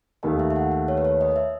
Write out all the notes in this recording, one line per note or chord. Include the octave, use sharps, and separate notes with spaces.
D#2 D#3 A3 D#5
E5
E5
F#5
E5
C#5
B4
C#5
D#5
E5